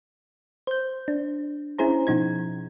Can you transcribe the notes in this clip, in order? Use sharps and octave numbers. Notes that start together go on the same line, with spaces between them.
C5 G6
D4
C#4 E4 G#4 C5 A#5
B2 F3 D#4 G#6